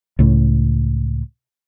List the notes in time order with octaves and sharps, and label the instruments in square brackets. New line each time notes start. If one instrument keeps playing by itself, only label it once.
[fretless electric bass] C#2 A2